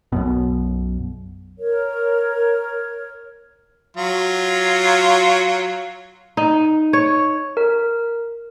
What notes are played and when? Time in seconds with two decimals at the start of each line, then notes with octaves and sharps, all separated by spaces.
0.12 B1 F#2 B2
1.57 A#4 C#5
3.97 F#3 F4
6.37 D#4
6.93 C#5
7.57 A#4